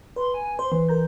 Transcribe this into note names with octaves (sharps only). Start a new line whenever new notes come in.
B4 C6
G#5
C5 C6
E3 C6
A#4 A#5 G6